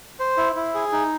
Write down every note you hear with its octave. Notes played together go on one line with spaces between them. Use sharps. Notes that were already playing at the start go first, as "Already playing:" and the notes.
C5
E4
E4
G#4
D#4